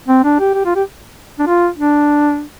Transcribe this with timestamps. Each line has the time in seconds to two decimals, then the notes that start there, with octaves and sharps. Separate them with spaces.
0.08 C4
0.24 D4
0.39 G4
0.54 G4
0.65 F4
0.76 G4
1.39 D4
1.47 F4
1.78 D4